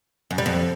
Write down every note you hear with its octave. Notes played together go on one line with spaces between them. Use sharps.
F#2
G3
F2